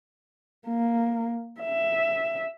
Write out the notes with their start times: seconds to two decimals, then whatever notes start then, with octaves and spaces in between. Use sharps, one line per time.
0.67 A#3
1.61 E5